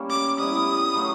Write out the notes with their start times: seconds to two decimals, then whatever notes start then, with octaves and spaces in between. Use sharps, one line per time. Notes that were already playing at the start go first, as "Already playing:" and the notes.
Already playing: G3 A#3 C#4
0.10 D6
0.38 G3 B3 E4 D#6
0.95 F#3 A3 D4 F4